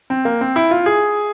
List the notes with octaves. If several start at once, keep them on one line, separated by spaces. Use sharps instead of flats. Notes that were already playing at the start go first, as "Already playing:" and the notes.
C4
A#3
C4
E4
F4
G#4